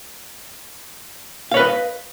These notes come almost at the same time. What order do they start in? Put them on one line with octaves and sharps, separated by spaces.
F5 C#5 B4 D#5